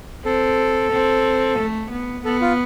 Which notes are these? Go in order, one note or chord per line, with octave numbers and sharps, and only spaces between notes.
C4 A4
C4
A3
B3
B3 A4
F4